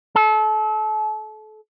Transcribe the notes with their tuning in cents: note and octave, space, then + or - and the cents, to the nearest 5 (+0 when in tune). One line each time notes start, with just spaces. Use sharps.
A4 -35